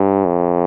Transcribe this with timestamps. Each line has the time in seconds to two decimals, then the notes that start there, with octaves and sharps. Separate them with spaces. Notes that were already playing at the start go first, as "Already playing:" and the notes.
Already playing: G2
0.26 F2